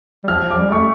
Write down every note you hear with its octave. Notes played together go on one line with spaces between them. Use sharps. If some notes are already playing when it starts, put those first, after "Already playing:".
G3
F3 F6
F3
D6
G3
A3 C#6